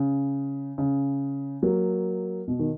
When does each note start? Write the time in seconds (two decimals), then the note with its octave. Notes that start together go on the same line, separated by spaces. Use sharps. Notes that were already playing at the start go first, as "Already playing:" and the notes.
Already playing: C#3
0.78 C#3
1.63 F#3 A#3
2.48 B2
2.59 D#3